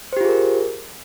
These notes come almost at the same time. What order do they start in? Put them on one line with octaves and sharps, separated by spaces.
C5 G4 F4 G#4 A#4